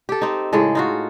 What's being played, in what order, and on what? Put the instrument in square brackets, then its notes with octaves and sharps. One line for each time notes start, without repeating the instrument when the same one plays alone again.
[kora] G4 A4
C4 D#4
A2 C#3 G#3 A4
D#4 F4 F#4